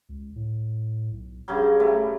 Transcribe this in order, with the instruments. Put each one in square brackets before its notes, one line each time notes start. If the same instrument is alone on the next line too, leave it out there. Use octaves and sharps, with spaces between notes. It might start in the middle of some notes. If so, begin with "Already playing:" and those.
[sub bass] C#2
A2
B1
[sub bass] E1 [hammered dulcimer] G2 C#3 F#3
[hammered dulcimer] G3 A3